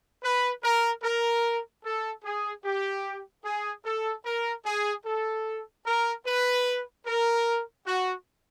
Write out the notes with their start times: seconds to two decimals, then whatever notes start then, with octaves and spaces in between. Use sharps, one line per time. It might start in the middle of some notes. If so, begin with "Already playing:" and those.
0.23 B4
0.64 A#4
1.03 A#4
1.84 A4
2.24 G#4
2.64 G4
3.44 G#4
3.85 A4
4.25 A#4
4.66 G#4
5.05 A4
5.86 A#4
6.26 B4
7.06 A#4
7.86 F#4